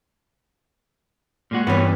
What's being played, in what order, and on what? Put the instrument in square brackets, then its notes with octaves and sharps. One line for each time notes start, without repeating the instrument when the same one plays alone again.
[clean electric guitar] A#2 G#3 F#4
[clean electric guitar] G2 E3 G3 [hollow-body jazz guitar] B3 C#4